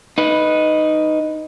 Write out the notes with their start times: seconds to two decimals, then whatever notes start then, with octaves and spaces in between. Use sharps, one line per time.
0.18 D#4 B4